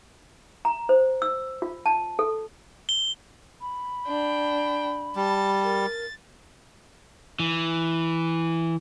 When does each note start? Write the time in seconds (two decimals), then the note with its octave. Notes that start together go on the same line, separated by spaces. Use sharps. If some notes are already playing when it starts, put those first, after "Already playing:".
0.65 A#5
0.89 C5
1.22 E6
1.62 F4
1.86 A5
2.19 A4
2.89 G7
3.61 B5
4.07 D4 G5
5.16 G3 A5 A6
5.63 A#4 A6
7.40 E3